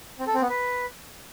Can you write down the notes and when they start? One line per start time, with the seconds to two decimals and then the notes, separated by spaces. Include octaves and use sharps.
0.20 C4
0.27 A4
0.34 C4
0.42 B3
0.49 B4